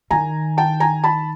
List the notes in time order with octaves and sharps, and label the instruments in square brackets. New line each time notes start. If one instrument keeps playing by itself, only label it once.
[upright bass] D#3 [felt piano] G#5 A#5
[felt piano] G5 A5
G#5 A#5
A5 B5